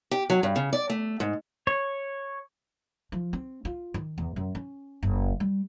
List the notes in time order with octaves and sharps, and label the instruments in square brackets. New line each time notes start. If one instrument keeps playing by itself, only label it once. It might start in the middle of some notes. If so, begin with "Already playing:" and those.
[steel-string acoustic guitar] G4
F#3
G2
C#3
D5
A3
G#2
[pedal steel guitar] C#5
[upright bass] F3
C4
F4
D#3
E2
F#2
C#4
F#1
G3